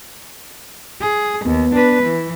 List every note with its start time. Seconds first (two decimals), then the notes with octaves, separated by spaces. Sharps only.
1.01 G#4
1.46 D#2 B3
1.74 D4 B4
2.03 E3